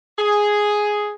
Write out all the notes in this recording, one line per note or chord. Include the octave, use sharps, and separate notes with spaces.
G#4